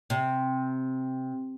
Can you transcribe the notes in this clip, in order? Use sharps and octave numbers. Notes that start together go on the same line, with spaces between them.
C3